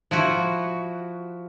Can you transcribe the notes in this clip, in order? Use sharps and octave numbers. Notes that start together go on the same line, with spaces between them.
F3 E4 F#4